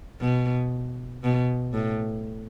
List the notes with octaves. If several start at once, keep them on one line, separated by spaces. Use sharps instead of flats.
B2
B2
A2